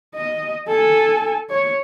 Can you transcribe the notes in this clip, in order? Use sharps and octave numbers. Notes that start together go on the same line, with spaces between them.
D#5
A4 G#5
C#5